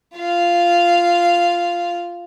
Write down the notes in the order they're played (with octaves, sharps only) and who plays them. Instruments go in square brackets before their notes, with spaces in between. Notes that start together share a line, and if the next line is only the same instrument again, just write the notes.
[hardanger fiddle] F4 F5